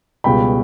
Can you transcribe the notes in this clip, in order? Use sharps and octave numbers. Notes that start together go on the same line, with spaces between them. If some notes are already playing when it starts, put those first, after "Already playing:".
C#2 B2 G3 G5 B5